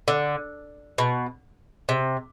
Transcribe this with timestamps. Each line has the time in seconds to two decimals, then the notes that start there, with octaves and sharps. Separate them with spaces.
0.08 D3
0.98 B2
1.89 C3